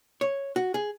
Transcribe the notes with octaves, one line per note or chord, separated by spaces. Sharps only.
C#5
F#4
G#4